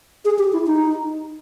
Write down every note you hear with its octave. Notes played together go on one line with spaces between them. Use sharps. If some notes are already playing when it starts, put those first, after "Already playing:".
G#4
G4
E4
D#4